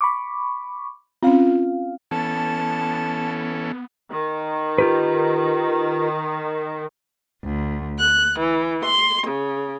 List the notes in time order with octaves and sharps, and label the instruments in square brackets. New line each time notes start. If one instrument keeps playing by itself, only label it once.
[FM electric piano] B5 C#6 D6
[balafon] C4 C#4 [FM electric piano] F4 F5
[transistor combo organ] E3 C#4 A4 [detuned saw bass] B3 [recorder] A5
[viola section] D#3
[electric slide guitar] F4 G4 B4
[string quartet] D2
F#6
E3
C6
C#3